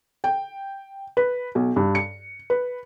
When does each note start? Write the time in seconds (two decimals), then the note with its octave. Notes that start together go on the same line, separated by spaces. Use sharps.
0.24 G5
1.17 B4
1.55 B1
1.76 G2
1.95 C#7
2.50 B4